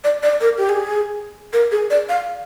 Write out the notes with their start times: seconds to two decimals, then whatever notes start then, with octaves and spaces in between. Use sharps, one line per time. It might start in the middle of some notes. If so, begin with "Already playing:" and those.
0.04 D5
0.22 D5
0.40 A#4
0.57 G4
0.69 G#4
1.53 A#4
1.71 G#4
1.90 D5
2.09 F5